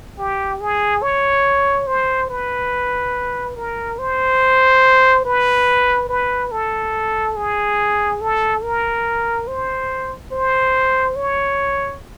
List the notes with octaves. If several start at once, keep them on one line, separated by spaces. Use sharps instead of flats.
G4
G#4
C#5
C5
B4
A#4
C5
B4
B4
A4
G#4
A4
A#4
C5
C5
C#5